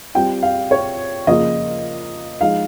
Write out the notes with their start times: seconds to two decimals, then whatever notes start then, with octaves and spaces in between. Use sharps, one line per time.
0.15 G3 C4 F4 G5
0.43 F5
0.71 C#5
1.27 C#3 F3 A#3 F4 D#5
2.41 F3 G#3 D#4 F5